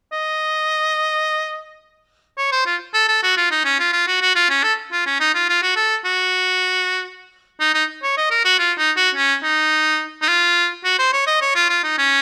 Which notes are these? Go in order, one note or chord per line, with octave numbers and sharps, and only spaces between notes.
D#5
C#5
C5
F4
A4
A4
F#4
F4
D#4
C#4
F4
F4
F#4
F#4
F4
C#4
A4
F4
C#4
D#4
F4
F4
F#4
A4
F#4
D#4
D#4
C#5
D#5
A#4
F#4
F4
D#4
F#4
C#4
D#4
D#4
F4
F#4
C5
C#5
D#5
C#5
F4
F4
D#4
C#4